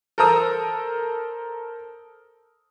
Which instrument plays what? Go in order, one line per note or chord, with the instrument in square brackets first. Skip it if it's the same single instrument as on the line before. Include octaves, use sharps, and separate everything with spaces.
[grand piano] A4 A#4 C5 A#5 D#6 E6